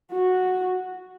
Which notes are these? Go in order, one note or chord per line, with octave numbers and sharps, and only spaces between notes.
F#4